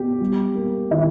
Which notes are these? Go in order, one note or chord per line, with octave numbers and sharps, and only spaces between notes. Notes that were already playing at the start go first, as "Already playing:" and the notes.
Already playing: B3 G4
G3
A#3
D#3 E4